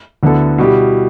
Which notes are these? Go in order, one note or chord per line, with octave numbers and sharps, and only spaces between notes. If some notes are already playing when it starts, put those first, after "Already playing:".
D2 D3 B3 E4 A4
B2 G3 E4 G4